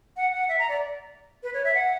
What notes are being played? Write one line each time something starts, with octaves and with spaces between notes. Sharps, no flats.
F#5
F#5
E5
A#5
D5
B4
C#5
E5
F#5